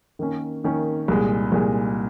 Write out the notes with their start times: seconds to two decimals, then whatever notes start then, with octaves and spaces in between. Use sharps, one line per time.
0.19 D#3 A#3 C#4
0.64 D#3 A#3 C#4
1.08 C2 A#2 G#3
1.52 C2 A#2 G#3